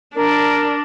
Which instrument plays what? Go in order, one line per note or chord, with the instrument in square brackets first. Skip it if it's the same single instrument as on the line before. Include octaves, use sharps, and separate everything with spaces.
[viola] D4 [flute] A#4